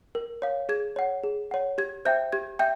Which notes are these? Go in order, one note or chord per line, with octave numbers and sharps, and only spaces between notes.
A#4
C#5 F5
G#4 G#6
C#5 F#5
G#4
C#5 F#5
G4 G#6
C5 E5 G5 G6
G4 G#6
E5 G5 G6